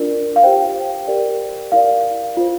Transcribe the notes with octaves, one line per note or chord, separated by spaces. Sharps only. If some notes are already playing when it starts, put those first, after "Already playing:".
Already playing: D4 F4 A#4 D5
F5
G4 C5 G5
G4 A#4 D5
E4 A#4 D5 F5
F4 C5